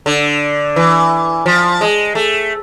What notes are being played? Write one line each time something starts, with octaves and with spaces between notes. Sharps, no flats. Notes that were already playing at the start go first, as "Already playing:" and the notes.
D3
E3
F3
G#3
A3